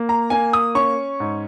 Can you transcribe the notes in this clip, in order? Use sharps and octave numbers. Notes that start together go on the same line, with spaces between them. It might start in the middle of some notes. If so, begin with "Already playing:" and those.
Already playing: A#3
A#5
A#3 G#5
D#6
C#4 C#6
G#2